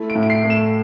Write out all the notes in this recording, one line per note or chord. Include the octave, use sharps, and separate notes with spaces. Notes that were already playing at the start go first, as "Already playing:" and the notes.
Already playing: A3 E4
D7
A2
D7
C7
A3
E7